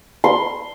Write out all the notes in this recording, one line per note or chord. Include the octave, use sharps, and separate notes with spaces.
C6